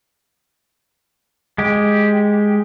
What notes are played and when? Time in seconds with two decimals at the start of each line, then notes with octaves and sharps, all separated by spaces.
1.58 G#3 G4